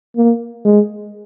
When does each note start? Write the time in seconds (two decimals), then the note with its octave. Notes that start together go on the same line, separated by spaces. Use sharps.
0.16 A#3
0.65 G#3